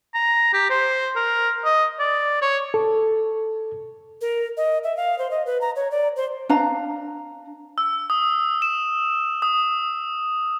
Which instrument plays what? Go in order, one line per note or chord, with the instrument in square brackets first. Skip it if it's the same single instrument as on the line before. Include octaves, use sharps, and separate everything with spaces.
[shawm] A#5
G4
C5
A#4
D#5
D5
C#5
[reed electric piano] A4
[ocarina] A#4
D#5
E5
F5
C5
D#5
B4
A#5
C#5
D5
C5
[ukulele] D4 F5 A#5
[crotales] E6
D#6
E7
D#6